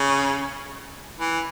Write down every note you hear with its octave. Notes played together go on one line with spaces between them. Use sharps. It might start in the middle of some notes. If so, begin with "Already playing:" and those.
Already playing: C#3
E3